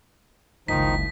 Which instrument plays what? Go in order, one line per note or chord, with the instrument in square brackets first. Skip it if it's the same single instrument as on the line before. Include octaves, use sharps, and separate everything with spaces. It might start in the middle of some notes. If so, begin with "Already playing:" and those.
[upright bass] F#1 C#2 [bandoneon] D#3 F3 D#4 [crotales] B6